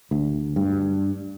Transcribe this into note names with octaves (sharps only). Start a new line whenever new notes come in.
D2
G2